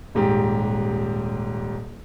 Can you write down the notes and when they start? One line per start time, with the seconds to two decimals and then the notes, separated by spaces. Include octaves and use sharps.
0.15 D#1 G#2 G4